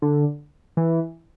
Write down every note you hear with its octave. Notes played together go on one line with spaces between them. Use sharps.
D3
E3